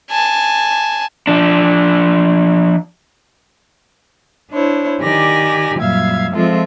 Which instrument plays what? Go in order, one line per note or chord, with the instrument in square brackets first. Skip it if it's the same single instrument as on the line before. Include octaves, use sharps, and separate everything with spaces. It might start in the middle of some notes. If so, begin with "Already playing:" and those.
[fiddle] G#5 A5
[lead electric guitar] F3 D4
[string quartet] D4 E4 C5 C#5
D#3 G4 D5 G#5 A#6
F#2 A#2 G3 E5 F5 G#6
F3 G#3 C4 F4 A4 E5